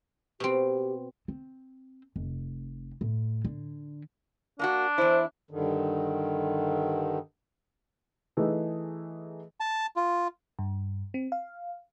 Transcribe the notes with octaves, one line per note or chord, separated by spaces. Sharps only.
B2 C4 G4
C4
F1
A2
D3
A#3 D4 E4 F#4
E2 E4 C5
G2 D3 D#3
E3 A3 D#4 G#4
A5
F4
G2
C4
F5